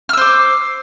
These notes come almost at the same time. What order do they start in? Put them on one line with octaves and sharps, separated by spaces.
F6 E6 C5 D6